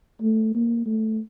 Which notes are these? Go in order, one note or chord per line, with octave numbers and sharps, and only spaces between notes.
A3
A#3
A3